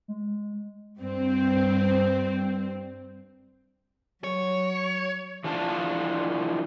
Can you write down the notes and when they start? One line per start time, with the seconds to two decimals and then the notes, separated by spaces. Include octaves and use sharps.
0.08 G#3
1.00 G2 C4
4.24 F#3 C#5
5.44 E3 F3 D4 F4 A5